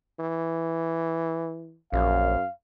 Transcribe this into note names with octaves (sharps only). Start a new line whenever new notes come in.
E3
A#1 F#2 F5